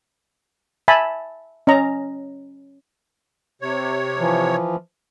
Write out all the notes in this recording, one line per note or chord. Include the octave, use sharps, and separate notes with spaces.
E5 G#5 A5 B5
C#4 D#5 A#5
C3 C#5
E3 F3